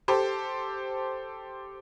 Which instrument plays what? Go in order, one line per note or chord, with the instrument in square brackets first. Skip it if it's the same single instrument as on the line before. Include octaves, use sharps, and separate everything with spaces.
[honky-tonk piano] G4 A4 C5